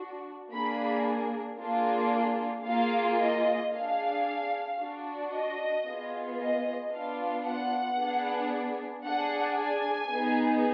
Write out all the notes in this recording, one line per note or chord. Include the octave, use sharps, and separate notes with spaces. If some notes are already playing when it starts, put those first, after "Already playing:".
Already playing: D4 F#4
A#3 D4 G#4 B5
A#3 D4 F4 G#4
A#3 F4 G#4 F5
D#5
D4 G#4 F5
D4 F#4
D#5
B3 F4 G#4
D#5
B3 D4 F4 F5
F#5
B3 D4 G#4
D4 G#4 F#5
G#5
B3 D#4 G#4